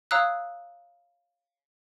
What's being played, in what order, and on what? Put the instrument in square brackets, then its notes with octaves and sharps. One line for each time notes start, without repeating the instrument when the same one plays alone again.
[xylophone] C#5 F5 A#5 D#6 E6 F#6